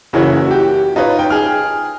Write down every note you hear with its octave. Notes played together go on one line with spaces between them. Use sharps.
F#1 C#3 E3 E4 F#4 C#5
F#4 G4
D#4 F4 B4 C#5
G5
G#4 F6